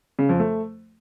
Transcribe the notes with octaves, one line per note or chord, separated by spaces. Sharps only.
C#3
F2
A3